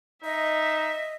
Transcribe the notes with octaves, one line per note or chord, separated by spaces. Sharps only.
D#4 D#5 E5